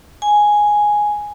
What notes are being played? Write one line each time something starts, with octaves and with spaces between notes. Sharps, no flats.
G#5